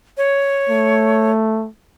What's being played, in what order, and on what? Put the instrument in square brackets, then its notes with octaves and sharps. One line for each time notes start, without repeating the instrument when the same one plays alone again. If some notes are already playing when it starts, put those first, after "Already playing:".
[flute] C#5
[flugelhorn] A3